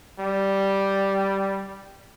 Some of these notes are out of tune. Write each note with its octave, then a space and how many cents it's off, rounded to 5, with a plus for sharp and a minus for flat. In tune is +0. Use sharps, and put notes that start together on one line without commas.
G3 -5